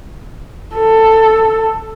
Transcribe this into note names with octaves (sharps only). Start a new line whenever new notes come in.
A4